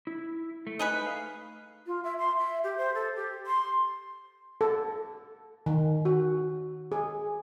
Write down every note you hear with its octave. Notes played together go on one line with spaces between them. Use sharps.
E4
A3
D#4 G#4 B4
F5
F4
E5
C6
E5
G4
C5
A4
G4
C6
A4
D#3
F#4
G#4